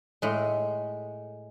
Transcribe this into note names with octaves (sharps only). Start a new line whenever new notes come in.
A2 G#3